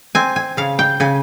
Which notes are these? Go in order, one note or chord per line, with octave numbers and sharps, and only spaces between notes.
C4 G#5
G#5
C#3 F5
G5
C#3 G#5